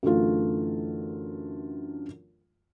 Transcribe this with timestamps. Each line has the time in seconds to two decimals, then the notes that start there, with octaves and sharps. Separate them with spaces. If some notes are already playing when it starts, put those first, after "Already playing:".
0.03 F#2 D3 E3 A3 F4